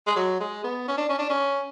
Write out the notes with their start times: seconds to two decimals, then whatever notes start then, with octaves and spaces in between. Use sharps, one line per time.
0.07 G#3
0.16 F#3
0.40 G#3
0.64 B3
0.88 C#4
0.98 D4
1.09 C#4
1.19 D4
1.29 C#4